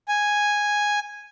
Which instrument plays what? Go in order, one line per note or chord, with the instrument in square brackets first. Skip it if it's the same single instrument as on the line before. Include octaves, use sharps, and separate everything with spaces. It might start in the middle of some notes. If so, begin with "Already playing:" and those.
[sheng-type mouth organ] G#5